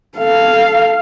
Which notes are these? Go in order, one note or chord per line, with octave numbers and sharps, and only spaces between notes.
A4 F5